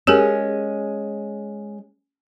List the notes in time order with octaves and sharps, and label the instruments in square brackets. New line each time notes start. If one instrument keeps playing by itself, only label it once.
[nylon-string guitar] G#3 C#4 [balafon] G4 G#4 A#4